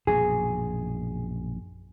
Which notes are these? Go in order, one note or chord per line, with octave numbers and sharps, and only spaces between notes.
A#1 F#2 B2 G#4